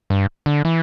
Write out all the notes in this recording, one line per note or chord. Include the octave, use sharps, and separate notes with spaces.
G2
D3
E3